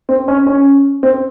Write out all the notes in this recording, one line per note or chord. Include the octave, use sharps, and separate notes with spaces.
C4
C#4
C#4
C4